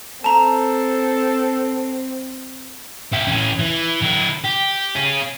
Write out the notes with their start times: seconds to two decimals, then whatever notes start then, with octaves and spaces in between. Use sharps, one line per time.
0.24 C4 A4 A5 A#5
3.13 E4 G4
3.27 E3 C#4
3.59 E3
4.02 D3 E4
4.45 G4
4.96 C#4 G#4